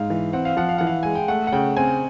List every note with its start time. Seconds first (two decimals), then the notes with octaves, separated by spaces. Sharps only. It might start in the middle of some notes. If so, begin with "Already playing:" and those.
Already playing: G#2 F5
0.10 E3
0.33 C4 F#5
0.45 F5
0.57 F3 F#5
0.69 F5
0.78 E3 F#5
0.87 F5
1.03 G#3 G#5
1.15 G5
1.28 A3 F#5
1.47 F#5
1.52 C#3 G5
1.77 C4 G#5